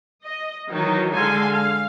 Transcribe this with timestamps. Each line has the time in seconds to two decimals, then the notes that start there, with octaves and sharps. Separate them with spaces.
0.23 D#5
0.70 D#3 E3 F#3 D#4
1.13 D3 G#3 A4 F5 G#5 C6
1.50 F5